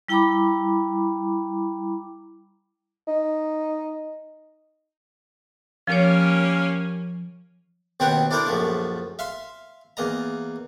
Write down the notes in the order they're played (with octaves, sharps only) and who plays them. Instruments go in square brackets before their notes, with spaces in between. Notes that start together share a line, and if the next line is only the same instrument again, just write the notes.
[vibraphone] G3 E4 G5 A#5 B5 D6
[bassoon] D#4
[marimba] F3 C#5 [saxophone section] G3 A#3 C#4
[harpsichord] D#2 B2 C4 C#5 F#5 G5
D4 E4 A4 A#4 C5 D5
A#1 F#2 F3 A3
E5 F5 C6
E2 A#3 D#5 A#5